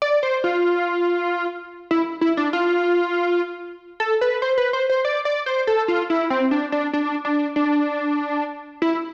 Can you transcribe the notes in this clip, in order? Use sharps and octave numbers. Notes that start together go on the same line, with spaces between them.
D5
C5
F4
E4
E4
D4
F4
A4
B4
C5
B4
C5
C5
D5
D5
C5
A4
F4
E4
C4
D4
D4
D4
D4
D4
E4